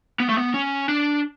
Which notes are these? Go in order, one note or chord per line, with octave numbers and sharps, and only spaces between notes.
B3
A3
B3
C#4
D4